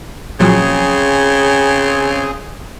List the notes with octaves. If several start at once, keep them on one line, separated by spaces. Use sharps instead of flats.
A#2 C#3 F3 F#3 C4 G#4